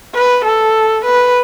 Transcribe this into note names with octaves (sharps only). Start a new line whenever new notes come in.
B4
A4
B4